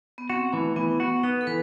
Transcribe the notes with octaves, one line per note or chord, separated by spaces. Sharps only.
B3
C4 F#4
E3 A3
E3 B3
B3 F#4
B3 D#4
A4
E3 B4